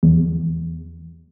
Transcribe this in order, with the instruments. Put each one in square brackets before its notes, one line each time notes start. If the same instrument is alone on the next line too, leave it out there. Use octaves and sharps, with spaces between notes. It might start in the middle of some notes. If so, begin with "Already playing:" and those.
[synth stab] E2